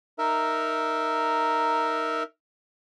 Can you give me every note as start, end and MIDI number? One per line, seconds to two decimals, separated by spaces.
0.19 2.23 63
0.19 2.23 70
0.19 2.23 76